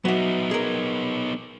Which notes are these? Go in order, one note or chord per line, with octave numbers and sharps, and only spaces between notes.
F#3 B3 D#4 E5
G#4 A#4